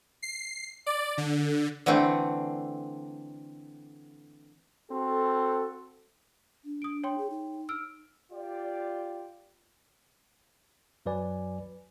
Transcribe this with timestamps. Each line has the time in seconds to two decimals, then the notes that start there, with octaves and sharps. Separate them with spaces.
0.22 C7
0.86 D5
1.18 D3
1.86 D3 E3 A3 C4
4.91 C4 F#4 A4
6.65 D4
6.82 D#6 D7
7.04 C#5 G5 C6
7.18 G#4
7.30 D#4
7.69 E6 F6 D7
8.32 F4 G4 D5
11.06 F#2 F#3 B4 D5 G#5